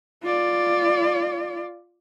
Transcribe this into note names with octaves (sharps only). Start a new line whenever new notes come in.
F4 D5